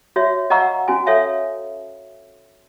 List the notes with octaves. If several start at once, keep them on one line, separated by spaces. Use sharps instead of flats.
F#4 C#5 E5
D#5 F5 F#5 A#5 C#6 E6
C#4 F#4 G#5
A4 C#5 E5 F5